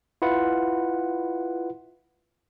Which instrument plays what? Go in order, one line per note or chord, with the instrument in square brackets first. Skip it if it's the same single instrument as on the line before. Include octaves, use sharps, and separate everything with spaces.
[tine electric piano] E4 F4 B4 F#5